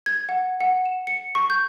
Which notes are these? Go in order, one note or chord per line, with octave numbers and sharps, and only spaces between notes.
G#6
F#5
F#5
E7
C#7
C#6
G6